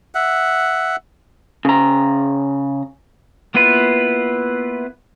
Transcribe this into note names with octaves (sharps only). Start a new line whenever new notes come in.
E5 F#5
C#3 A#5
A#3 B3 E4 F4 B4